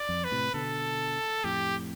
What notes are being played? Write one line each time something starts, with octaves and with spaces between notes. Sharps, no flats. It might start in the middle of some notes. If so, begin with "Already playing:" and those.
Already playing: D5
F2
B4
A2 C3
B2 D3 A4
F2 A2 G4